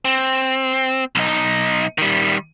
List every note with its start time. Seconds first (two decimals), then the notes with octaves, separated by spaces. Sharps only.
0.05 C4
1.15 B1 D#4
1.98 D#3 G3